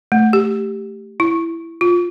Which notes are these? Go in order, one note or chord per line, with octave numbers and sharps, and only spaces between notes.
A3
G4
E4
F4